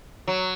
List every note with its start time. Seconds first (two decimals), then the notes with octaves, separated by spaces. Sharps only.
0.28 F#3